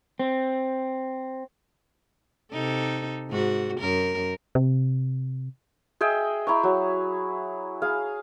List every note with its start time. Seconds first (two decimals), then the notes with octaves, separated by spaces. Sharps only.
0.20 C4
2.52 C3 D#4 A4
3.30 G#2 F#4
3.79 F#2 A#4
4.55 C3
6.01 G#4 D#5 E5 G5
6.47 E4 A#5 C#6
6.63 F#3
7.82 G#4 F5